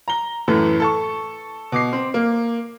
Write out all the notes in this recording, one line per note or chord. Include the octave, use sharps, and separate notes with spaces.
A#5 G7
F#2 A2 E3 A3
A4 A5 C#6
B2 D6 C7
C4
A#3